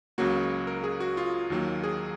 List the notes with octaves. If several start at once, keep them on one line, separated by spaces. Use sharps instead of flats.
C#2 C#3 F#3 A#3 F#4
A#4
G#4
F#4
F4
D#2 D#3 F#3 A#3
G#4